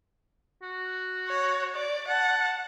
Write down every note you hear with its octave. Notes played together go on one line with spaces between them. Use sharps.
F#4
C#5
D5
F#5 A5